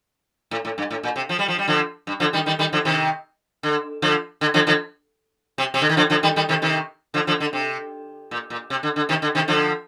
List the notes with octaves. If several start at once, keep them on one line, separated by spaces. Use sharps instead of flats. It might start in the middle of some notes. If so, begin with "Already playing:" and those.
A2
A2
G2
A2
A#2
C3
F3
G3
F3
G3
D3 F3
G2
D3 F3
D#3 G3
D#3 G3
D#3 G3
D3 F3
C3 D#3
D3
D3 F3
D3
D3 F3
D3 F3
C3
C3
D3
D#3
D3 F3
D3 F3
D#3 G3
D#3 G3
C3 D#3
C3 D#3
D3 F3
D3 F3
D3
C3
A#2
A#2
C3
D3
D3
C3 D#3
D3
C3 D#3
D3 F3